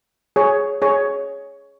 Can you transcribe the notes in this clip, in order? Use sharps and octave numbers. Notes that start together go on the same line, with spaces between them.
G#4 C#5
G#4 C#5